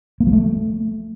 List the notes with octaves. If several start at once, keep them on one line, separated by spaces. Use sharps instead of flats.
A#3
F#3
A3